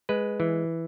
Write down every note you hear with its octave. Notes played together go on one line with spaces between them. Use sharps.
G#3 B4
E3